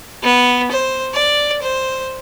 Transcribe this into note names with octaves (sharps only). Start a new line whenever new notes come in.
B3
C5
D5
C5